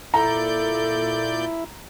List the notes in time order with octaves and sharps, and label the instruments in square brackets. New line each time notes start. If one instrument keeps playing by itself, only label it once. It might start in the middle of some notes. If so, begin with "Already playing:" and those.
[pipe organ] A#2 D5 G6 [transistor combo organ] E4 [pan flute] A4 [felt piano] A#5